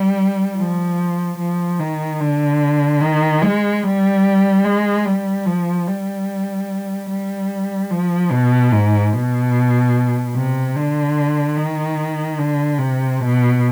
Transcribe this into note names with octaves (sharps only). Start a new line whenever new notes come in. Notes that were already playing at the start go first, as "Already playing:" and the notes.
Already playing: G3
F3
F3
D#3
D3
D#3
G#3
G3
G#3
G3
F3
G3
G3
F3
B2
G#2
B2
C3
D3
D#3
D3
C3
B2